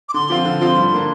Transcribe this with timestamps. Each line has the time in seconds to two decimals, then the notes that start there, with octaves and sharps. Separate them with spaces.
0.09 D6
0.14 D3 C6
0.30 F3 C4 F4
0.45 D3
0.61 F3 C4 F4
0.76 G2
0.92 D3 A#3 D4